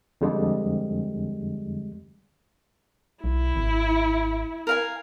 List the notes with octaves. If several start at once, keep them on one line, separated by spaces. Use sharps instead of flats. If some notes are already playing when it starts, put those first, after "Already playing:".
F2 D3 G3 G#3
B1 E4
G#1
A#4 F5 G#5